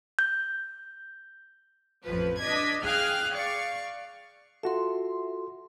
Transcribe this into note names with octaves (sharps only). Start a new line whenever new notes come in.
G6
A1 F2 F3 B4
D4 D#5 G#6 B6
G#4 F5 G5 F6 F#6
D5 F5 C#6
F4 F#4 A4 E5 C6